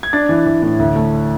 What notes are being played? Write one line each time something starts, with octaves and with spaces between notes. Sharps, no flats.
G#6
D4 A6
E3
E3
A2
D2
A3